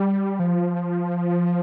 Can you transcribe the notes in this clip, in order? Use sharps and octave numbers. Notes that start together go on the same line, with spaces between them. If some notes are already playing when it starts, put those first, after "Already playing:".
Already playing: G3
F3